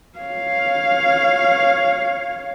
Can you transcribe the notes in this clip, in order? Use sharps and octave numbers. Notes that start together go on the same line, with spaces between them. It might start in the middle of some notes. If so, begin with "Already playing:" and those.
C#5 F5